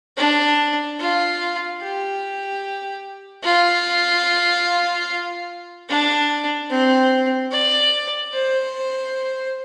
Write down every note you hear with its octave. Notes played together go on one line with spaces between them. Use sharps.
D4
F4
G4
F4
D4
C4
D5
C5